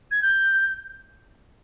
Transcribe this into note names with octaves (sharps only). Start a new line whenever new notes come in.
G#6
G6